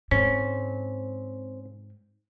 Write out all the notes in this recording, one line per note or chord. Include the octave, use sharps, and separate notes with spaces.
G#2 C4 C#4 A4 C5